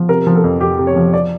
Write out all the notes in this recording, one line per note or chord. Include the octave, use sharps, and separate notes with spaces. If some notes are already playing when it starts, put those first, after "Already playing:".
Already playing: F3
C3 A#4
F3
A4
F2
F2 G4
C3
C#5
F3
D5